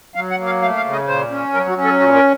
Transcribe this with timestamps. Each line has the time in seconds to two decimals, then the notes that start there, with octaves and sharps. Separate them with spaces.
0.15 F#3 F5
0.31 F#5
0.38 A#3
0.46 F5
0.62 A3 F5
0.77 F5
0.85 C#3
0.92 D#5
1.08 A#2 C5
1.31 C#4
1.54 F#3 A#4
1.69 F#4
1.77 C#4
1.85 A4
2.00 A#2 F#4
2.15 A#4